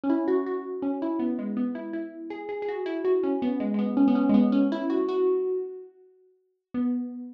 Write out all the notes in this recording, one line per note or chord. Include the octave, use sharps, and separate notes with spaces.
C#4
E4
F#4
F#4
C#4
E4
B3
G#3
B3
E4
E4
G#4
G#4
G#4
F#4
E4
F#4
C#4
B3
G#3
G#3
B3
C#4
B3
C#4
G#3
B3
C#4
E4
F#4
F#4
B3